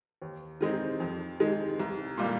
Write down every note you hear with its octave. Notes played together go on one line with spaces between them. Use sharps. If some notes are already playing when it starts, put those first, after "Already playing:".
D#2
D#3 G#3 C4 D#4
F2
D#3 G#3
C2
A#2 G3 A#3 F4